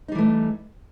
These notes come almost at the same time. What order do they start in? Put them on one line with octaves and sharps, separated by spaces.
D#4 G3 E3 A3